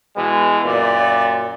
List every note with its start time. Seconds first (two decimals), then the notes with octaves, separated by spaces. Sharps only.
0.15 B2 E3 G#3
0.64 F#2 A#2 D5